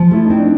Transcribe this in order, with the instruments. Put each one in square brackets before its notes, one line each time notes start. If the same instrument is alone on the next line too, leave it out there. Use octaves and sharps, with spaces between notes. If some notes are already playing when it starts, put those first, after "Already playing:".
Already playing: [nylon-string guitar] F3
[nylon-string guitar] A3 [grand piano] E4
[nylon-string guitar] C4 [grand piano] D#4
[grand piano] D4